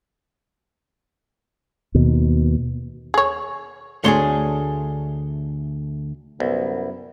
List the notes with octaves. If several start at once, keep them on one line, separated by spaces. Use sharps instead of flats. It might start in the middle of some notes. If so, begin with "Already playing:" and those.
D#2 B2
G#4 C#5
D2 A3 D4 G#4 C#5 C6
C2 F#2 B3